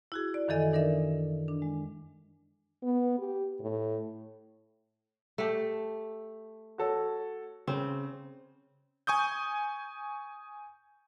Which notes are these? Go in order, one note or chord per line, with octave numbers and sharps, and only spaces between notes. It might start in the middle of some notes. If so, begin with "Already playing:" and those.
E4 F#4 G#4
D5
F#2 D#3 E3 A4 D#5 G#5
D4 D#4 A#4 D5 E5
D4
G#3
B3
G4
A2
A3 G4
F#4 A4 C#5
C#3 C4
G#5 C#6 D#6 G6